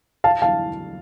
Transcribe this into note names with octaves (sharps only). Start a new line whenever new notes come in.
F5 A5
F5 A5